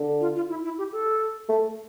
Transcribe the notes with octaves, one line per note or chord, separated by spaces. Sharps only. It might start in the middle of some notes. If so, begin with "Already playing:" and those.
Already playing: D3
F4
F4
E4
E4
G4
A4
A3